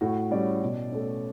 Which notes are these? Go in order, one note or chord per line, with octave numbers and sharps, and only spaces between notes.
A2 F#4
G3 C#4 D5
B2
A3 C#4